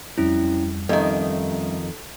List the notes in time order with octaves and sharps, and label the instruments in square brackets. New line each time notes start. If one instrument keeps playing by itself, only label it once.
[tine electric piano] F2 G3 [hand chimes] C#4 E4
[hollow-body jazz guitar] F2 D#3 [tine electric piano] G3 C#4 E5 [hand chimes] A4